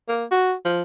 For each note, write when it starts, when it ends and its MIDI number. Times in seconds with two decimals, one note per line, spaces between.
0.08 0.24 58
0.31 0.54 66
0.65 0.82 53